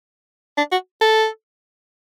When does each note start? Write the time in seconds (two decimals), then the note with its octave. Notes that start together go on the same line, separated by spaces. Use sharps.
0.58 D4
0.72 F#4
1.01 A4